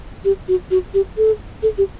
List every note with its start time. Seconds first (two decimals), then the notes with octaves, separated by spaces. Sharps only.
0.24 G4
0.48 F#4
0.71 F#4
0.94 G4
1.17 A4
1.62 A4
1.78 G4